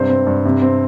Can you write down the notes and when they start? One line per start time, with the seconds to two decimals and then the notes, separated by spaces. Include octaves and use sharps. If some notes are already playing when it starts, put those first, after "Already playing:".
Already playing: G2 C3 C5
0.09 C4
0.27 G2
0.45 C3
0.62 C4